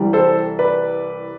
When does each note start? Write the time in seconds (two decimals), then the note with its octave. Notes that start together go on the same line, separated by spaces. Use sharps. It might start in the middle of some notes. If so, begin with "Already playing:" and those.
Already playing: C2 C3 E3 G3
0.13 A4 C5
0.59 B4 D5